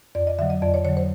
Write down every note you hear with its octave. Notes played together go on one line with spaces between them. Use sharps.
F2 D5
D#5
D3 F#3 E5
D#5
F2 D5
C#5
D3 F#3 C#5
C5